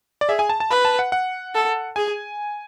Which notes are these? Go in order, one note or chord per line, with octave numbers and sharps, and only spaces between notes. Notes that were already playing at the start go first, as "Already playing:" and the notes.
D5
G#4 E5
G#5
A5
A5
B4 B5
A5
F#5
F#5
A4
G#4 G#5